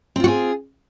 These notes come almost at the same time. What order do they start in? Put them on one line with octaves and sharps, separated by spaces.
C4 F4 F#4 G#4